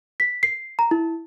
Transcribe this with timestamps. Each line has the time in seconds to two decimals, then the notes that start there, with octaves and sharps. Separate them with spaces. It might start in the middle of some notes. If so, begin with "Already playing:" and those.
0.20 B6
0.43 C7
0.79 A#5
0.91 E4